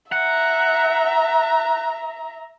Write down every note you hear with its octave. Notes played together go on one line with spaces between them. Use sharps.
E5 F#5 A#5